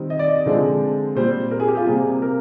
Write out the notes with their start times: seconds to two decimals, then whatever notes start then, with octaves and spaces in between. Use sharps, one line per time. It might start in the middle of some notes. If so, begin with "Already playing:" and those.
Already playing: D#3 G3 C4
0.10 D#5
0.19 D5
0.28 D#5
0.37 D5
0.46 D3 F3 G#3 C4
1.15 A#2 G3 C4 C5
1.51 A#4
1.60 G#4
1.68 G4
1.77 F4
1.86 C3 G3 A#3 G#4
2.22 A#4